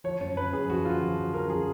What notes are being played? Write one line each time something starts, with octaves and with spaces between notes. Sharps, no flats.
F3 C#5
F#2 C#5
F#2 B4
F#2 G#4
F3 F#4
F3 F4
F3 F#4
F3
F#2 A#4
F3 G#4